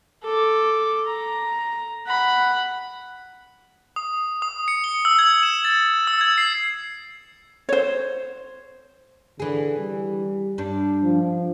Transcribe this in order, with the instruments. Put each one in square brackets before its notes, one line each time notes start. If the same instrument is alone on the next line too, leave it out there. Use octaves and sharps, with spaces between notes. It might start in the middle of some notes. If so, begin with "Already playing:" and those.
[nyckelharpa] A4 D6
A#5
F#5 B5
[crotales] D#6
D#6
C#7
G7
E6
G#6
E7
A6
E6
G#6
C7
[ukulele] C5 C#5
[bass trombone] D3 [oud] E3 G#4
[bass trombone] G3
[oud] G2 D4
[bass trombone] F3